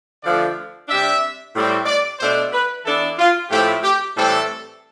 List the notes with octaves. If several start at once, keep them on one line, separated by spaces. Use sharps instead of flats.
D3 F3 A3 D4 D5
C3 G3 D4 E5
A2 G3 C4
D5
B2 A3 D4 C5
B4
E3 B3 D4 A4
F4
A2 F3 A3 C4 E4 G4
G4
A2 E3 G3 C4 A4